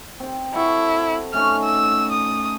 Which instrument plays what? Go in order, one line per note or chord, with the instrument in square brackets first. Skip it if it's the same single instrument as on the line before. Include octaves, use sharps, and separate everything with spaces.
[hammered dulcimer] C4 G5
[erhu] E4 [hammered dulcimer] F#4 A4
[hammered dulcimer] A3 C#4 D#4 [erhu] F6
[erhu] E6
D#6